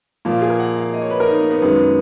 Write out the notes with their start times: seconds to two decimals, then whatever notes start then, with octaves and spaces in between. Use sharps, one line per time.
0.25 A#2 F3 A#3
0.33 F4
0.42 G#4
0.50 A#4
0.59 F#5
0.77 F5
0.94 D#5
1.02 C#5
1.10 B4
1.20 A#4
1.28 D#4
1.40 B3
1.51 B3
1.62 F#2 D#3 G#3 B3